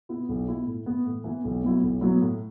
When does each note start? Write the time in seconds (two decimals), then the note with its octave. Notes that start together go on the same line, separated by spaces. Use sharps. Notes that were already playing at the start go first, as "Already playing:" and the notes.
0.09 B2 B3 E4
0.29 B1
0.48 B2 B3 E4
0.66 A2
0.86 E3 B3
1.06 A2
1.24 E3 B3
1.44 B1
1.63 B2 F#3 B3 E4
1.83 B1
2.01 B2 F#3 B3 E4
2.21 A2